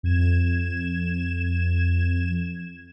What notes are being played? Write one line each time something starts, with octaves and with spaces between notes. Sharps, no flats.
F2 G#6 E7